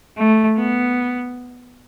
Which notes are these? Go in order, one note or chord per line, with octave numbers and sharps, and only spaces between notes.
A3
B3